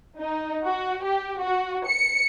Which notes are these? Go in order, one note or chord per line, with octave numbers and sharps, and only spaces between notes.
D#4
F#4
G4
F#4
C#7